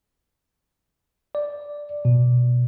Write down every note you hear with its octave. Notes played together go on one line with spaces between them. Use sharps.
D5
B2